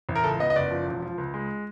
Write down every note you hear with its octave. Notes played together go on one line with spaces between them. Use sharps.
A1
A#4
C#2 A4
B3 D#5
D#5
F#1 D5
F3
E1
F3
C#2
G#3